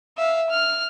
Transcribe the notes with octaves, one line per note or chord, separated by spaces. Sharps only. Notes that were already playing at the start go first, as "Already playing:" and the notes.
E5 F5
F6